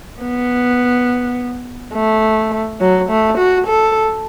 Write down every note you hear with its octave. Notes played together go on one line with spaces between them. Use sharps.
B3
A3
F#3
A3
F#4
A4